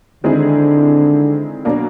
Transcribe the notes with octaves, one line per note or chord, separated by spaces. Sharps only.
D3 D#3 G#3 C4 E4 G#4
B2 F#3 A#3 D4